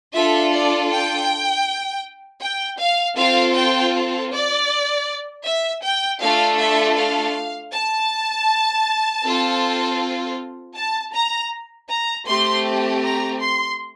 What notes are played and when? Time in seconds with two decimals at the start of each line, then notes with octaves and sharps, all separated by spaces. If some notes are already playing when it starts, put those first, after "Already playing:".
0.14 D4 F4 A4 E5
0.52 D5
0.90 G5
2.41 G5
2.79 F5
3.17 C4 F4 A4 F5
3.55 G5
4.31 D5
5.45 E5
5.83 G5
6.20 A3 D4 F4 A4 F5
6.58 E5
6.96 F5
7.72 A5
9.24 C4 F4 A4
10.76 A5
11.13 A#5
11.89 A#5
12.27 A3 C4 G4 C6
13.03 A#5
13.41 C6